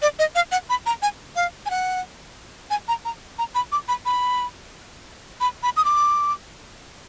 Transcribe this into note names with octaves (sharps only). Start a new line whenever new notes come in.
D5
D#5
F5
F#5
B5
A#5
G#5
F5
G#5
F#5
G#5
A#5
A#5
A#5
B5
D6
B5
B5
B5
B5
D#6
D6